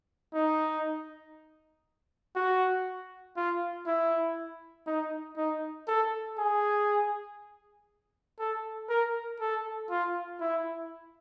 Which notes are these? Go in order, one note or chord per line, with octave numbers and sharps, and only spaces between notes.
D#4
F#4
F4
E4
D#4
D#4
A4
G#4
A4
A#4
A4
F4
E4